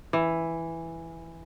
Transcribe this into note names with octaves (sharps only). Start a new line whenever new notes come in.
E3